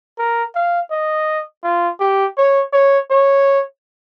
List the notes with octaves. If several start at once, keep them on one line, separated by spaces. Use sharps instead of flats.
A#4
F5
D#5
F4
G4
C#5
C#5
C#5